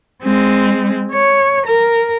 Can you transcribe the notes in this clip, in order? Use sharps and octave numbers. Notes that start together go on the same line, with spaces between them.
G#3 C4
C#5
A#4